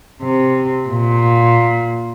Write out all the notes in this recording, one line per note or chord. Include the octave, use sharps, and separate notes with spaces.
C3
A#2